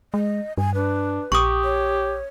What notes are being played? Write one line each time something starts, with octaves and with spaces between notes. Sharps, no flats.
G#3 D#5
G2 G#5
D4 B4
A#1 G4 C#6 D#6
C#5